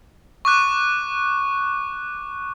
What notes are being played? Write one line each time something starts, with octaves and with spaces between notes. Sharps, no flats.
C#6 D6 F#6